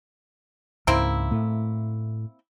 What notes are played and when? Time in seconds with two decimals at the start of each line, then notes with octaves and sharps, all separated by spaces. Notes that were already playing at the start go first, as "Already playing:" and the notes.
0.87 C#2 G#2 A#3 C4 E4
1.31 A2 A3